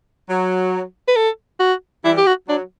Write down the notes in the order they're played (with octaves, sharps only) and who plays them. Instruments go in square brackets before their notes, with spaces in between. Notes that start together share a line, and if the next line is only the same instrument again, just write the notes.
[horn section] F#3
[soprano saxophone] B4
A4
F#4
[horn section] E3 G3 [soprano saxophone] E4
[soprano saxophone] G4
F#4
[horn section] F#3 [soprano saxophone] D4